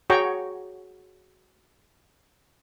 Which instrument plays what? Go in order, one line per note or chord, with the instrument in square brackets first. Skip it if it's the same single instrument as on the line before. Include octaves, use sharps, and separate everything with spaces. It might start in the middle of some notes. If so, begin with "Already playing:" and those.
[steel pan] F#4 G#4 C#5 G5 A#5 C#6